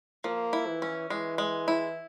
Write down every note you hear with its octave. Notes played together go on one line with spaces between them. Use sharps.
F3 A#3
E4
E3
C#4
E3 G#3
G#3
E4